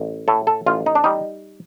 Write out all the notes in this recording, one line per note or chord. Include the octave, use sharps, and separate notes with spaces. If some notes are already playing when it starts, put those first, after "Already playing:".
Already playing: A1
A2 A4
A4
A1 F4
D#4
D4
G3 D#4